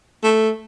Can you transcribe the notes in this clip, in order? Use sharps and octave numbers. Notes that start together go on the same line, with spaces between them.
A3